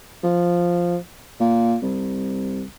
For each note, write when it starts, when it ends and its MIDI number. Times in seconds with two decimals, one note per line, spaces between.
0.23 0.97 53
1.40 1.76 46
1.82 2.64 36